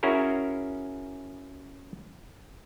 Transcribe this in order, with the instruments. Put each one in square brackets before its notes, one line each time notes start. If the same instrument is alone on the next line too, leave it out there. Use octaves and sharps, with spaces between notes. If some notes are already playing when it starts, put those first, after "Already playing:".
[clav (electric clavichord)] C#4 E4 F#4 G#4 A#4